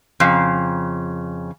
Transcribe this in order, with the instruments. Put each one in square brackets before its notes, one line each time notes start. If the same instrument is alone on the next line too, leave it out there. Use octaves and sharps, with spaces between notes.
[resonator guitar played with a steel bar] F2 C#3